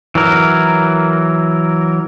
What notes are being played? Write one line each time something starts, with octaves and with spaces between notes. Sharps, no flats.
E3 F#3 A#4